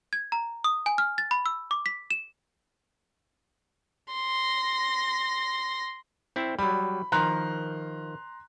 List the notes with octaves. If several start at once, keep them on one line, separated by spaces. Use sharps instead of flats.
G#6
A#5
D#6
G#5
F6
A6
B5
E6
D6
B6
E7
C6 A#6
C4 E4
F#3 G3 B5
D#3 F3 A#5 C6 F#6